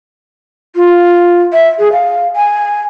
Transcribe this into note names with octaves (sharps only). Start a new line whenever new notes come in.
F4
E5
G#4
F5
G#5